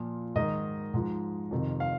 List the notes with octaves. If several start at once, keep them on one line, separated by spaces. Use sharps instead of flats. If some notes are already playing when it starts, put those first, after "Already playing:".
Already playing: A#2 F3
G#2 D#3 D#5
G#2 F3
F2 C3 D#3
F5